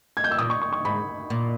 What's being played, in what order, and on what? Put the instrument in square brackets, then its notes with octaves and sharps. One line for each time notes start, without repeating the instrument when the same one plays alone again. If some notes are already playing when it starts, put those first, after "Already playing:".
[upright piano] G#6
G6
E6
[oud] A#2 [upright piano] D#6
[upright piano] C#6
C#6
C#6
[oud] G#2 [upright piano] B5
[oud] A#2